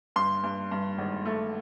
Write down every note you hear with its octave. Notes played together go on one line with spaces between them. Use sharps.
G2 C6
G2
G2
G#1
A3